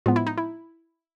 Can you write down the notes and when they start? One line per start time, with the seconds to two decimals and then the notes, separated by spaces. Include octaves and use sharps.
0.06 A2 F3 G#3 B3 F4
0.16 E4
0.27 D#4
0.37 E4